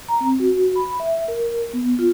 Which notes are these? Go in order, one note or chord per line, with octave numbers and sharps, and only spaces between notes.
A#5
C4
F#4
B5
E5
A#4
B3
F4